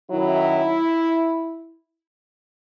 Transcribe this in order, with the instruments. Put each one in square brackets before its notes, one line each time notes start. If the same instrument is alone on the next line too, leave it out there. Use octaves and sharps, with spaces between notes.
[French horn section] F#2 D#3 F#3 E4